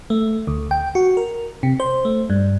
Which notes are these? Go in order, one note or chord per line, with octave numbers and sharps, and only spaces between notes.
A3
D2
G5
F#4
A#4
C3
C5
A3
G2